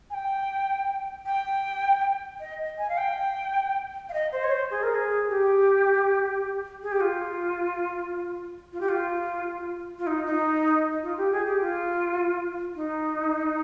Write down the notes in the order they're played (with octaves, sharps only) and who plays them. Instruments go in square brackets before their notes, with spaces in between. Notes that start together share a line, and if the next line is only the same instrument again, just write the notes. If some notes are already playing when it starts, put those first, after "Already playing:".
[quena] G#5
G5
G5
D#5
G#5
F5
G5
F5
D#5
C5
C#5
C5
G#4
A#4
G#4
G4
G#4
G4
F4
F4
G4
F4
F4
D#4
D#4
F4
G4
G#4
G4
F4
D#4